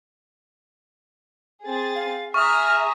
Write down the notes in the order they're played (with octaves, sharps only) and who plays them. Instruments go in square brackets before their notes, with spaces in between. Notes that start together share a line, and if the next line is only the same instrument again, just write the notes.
[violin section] C4 G#4 A6
[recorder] F5
[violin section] G#4 E5 A#5 [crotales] C#6 D#6 [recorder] F6